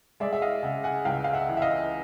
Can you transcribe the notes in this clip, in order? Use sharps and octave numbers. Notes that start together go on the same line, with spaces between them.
G#3 D5 E5
E5
D#5 F5
C#3 E5 F#5
F#5 G#5
C#2 F5 G5
F5
E5 F#5
E3
E5
D#5 F5